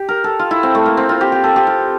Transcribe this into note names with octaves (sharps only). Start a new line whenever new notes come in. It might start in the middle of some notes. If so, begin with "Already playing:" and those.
Already playing: G4
A#4
A4
F4
E4
C4
A3
A#3
C4
F4
G4
G4
A4
G4
F4